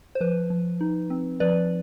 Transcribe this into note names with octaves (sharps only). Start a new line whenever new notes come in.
C5
F3 B4
F3
D#4
C4
F3 B4 D5